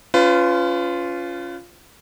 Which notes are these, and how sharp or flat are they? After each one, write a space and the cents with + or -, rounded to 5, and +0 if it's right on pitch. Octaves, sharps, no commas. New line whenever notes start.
C#4 +20 F4 -5 B4 +35